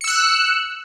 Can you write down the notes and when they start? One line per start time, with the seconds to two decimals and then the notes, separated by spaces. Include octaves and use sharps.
0.01 C#7
0.04 E6
0.07 F#6